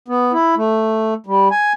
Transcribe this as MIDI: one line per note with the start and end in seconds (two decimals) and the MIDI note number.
0.08 0.32 59
0.33 0.55 64
0.57 1.14 57
1.26 1.48 55
1.51 1.73 80